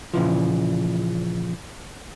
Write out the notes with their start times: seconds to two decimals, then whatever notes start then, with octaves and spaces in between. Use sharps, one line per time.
0.14 A#2 C#3 E3 F3